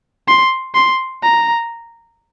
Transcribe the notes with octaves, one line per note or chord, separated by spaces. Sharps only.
C6
C6
A#5